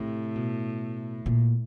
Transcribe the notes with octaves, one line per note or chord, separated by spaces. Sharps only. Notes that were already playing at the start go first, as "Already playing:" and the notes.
Already playing: A2 C3
B2
A#2